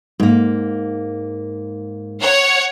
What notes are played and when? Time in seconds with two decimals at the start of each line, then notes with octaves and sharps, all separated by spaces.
0.20 G#2 A#3
2.21 C#5 F#5